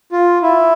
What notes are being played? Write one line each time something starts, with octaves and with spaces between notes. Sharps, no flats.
F4
E4